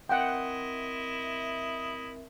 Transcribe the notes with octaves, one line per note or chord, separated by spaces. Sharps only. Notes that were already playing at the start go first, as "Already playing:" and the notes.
C4 E4 A#4 D#5 E5 F#5 G5